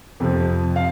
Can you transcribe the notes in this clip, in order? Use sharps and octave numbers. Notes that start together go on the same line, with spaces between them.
F2 C3 F3
F5